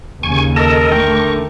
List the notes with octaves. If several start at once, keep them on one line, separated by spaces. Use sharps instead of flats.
D#2 C#3 G#5 C#6
A4 A#4 D#5 A5
D3 A3 D4 G5 C#6